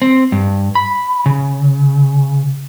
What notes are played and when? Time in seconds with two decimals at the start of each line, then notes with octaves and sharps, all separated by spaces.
0.02 C4
0.32 G2
0.75 B5
1.26 C#3